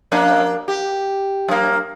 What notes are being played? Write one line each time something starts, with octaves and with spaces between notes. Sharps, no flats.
F2 A#3 D4
G4
F#2 A#3